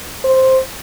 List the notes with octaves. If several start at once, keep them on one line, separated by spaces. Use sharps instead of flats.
C5